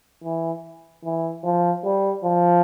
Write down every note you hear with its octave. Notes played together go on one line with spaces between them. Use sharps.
E3
E3
F3
G3
F3